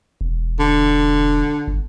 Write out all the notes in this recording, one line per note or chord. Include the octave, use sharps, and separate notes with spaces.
E1
D3
G1